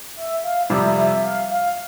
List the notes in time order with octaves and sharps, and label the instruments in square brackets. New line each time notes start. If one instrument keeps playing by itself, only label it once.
[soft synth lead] E5
F5
[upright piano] F2 C3 G3 [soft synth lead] E5
[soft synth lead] E5
F5
F5